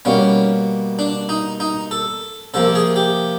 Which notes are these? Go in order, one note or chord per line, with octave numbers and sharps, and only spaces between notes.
B2 G3 A#3 C#4
D4
D#4
D#4
A4
C3 F3 A#3 A4
G#4
G4